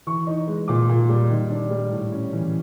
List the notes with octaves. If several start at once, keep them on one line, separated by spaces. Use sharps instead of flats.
E3 C#6
D#4
G#3
A#2 D6
A#2
G3
D#3
D4
G3
A2
C#4
E3